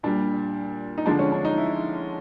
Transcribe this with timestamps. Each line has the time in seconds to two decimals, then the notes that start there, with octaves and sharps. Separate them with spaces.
0.03 A#2 G3 D4
0.98 D#4
1.06 D3 F3 G#3 D4
1.19 C#4
1.32 D4
1.45 D#4
1.57 E4